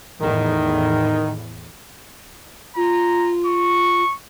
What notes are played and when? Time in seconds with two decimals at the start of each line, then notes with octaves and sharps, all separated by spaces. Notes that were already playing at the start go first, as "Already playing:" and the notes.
0.20 E2 A2 D#3
2.76 F4 A#5
3.46 C#6